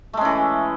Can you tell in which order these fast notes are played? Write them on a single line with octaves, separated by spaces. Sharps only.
A3 G#3 C#4 E3